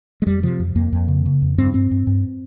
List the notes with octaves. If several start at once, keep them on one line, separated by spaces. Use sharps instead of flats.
G#3
F2 G3
C3 F3
F2
F2 A#3
F2
C#3
C#3
F2
G2 C4
G2 C4
G2
G2